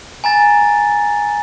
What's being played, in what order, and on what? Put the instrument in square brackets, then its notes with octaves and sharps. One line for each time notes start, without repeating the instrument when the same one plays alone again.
[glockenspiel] G#5 A#5 A6